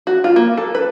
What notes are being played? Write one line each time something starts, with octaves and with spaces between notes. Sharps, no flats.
F#4
F4
A#3
A4
B4